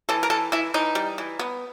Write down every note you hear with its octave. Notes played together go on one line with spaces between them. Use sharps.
E3 A4
A#4
E3 A4
E3 E4
E3 D#4
G3
E3
B3